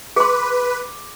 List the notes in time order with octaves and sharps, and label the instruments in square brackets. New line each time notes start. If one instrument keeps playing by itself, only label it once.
[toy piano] G#4 C6 [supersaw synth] B4 [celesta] D6